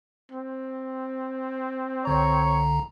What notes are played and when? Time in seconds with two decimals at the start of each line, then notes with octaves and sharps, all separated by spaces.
0.32 C4
2.05 C2 D3 C#5 A#5